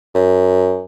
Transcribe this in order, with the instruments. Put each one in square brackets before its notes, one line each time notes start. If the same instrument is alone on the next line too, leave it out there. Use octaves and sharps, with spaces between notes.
[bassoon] F#2